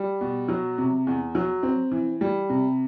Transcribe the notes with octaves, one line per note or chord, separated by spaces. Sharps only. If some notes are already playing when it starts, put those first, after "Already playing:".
Already playing: G3
B2
F#3
C3
E2
F#3
C4
E3
G3
C3